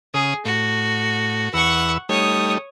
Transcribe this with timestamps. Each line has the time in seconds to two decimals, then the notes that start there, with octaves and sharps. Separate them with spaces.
0.14 C#3 G#4 D#6
0.45 A2 F#4
1.54 E2 B4 F#5 C#6 E6
2.09 G3 A3 D#4 C#5 D#6